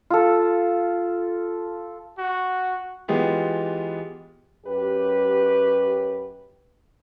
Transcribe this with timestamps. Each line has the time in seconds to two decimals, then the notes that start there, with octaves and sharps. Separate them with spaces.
0.10 F4 A4
2.18 F#4
3.08 E3 G#3 B3 F4 G4
4.66 F#2 G4 B4